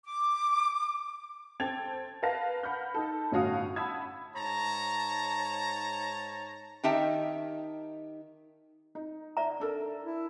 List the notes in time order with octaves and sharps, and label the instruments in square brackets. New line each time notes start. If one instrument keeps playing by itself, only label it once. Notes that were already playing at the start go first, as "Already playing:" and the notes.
[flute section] D6
[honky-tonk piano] C4 A4 G5 G#6 A6 F7
A#4 B4 F5 A5 A#6
F#5 B5 F6 G6
D#4 A4
G1 A2 C#4 F#4 F5 D#6
F#5 A5 B5 D#6 E6 G#6
[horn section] G#2 C#5 A5 A#5
[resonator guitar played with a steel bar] D#3 D#4 G4 E5 G5 A5
[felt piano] D#4
[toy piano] D5 E5 A#5
[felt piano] D4 A4 A#4
[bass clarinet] E4